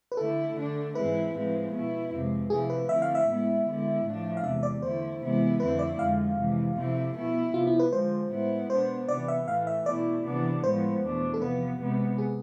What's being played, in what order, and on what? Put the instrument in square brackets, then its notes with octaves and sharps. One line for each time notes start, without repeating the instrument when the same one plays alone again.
[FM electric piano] B4
[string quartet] D3 A3 E4 [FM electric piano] A4
[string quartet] D3 A3 D4
[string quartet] G#2 E3 G#3 C4 E4 [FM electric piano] B4
[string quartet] A2 F3 G#3 C4 E4
B2 B3 E4
F2 C3 G#3 C4
[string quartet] C3 F3 A3 C4 E4 [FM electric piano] G#4
[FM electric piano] B4
[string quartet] D3 A3 C4 E4 [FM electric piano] E5
[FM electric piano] F5
E5
[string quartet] A2 G#3 B3 E4
D3 G#3 B3 E4
A2 F3 A3 D4
[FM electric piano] F5
[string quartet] E2 C3 G#3 [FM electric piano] E5
[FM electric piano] D5
[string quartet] D3 A3 E4 [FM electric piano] C5
[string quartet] C3 E3 G#3 B3 E4
[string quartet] F2 D3 A3 C4 E4 [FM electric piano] B4
[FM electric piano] D5
[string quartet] F2 D3 F3 G#3 [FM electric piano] F5
[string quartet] C3 E3 G#3
C3 F3 A3 C4 E4
B2 B3 E4
[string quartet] C3 F3 B3 [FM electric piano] F4
[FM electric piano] E4
B4
[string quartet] D3 F3 G#3 [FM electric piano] C5
[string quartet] A2 G#3 B3 E4
[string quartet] B2 B3 D4 [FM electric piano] C5
[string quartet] C3 E3 B3 [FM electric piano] D5
[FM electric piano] E5
[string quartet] A2 E3 A3 [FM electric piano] F5
[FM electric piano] E5
[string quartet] B2 A3 E4 [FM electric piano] D5
[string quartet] C3 E3 B3 D4
[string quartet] A2 F3 G#3 B3 [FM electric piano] C5
[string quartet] E2 B2 A3 D4
[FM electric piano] A4
[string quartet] C3 F3 B3 [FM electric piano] B4
[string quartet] C3 G#3 B3
[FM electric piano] G#4